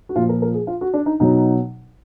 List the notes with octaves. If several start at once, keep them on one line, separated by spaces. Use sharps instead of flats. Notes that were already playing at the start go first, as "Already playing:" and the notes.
F#4
A#2 F3 F4
A#4
A#4
G#4
F4
F#4
D4
D#4
B2 F#3 D#4